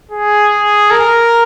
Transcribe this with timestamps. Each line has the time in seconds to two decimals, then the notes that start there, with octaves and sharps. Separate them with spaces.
0.11 G#4
0.91 A#4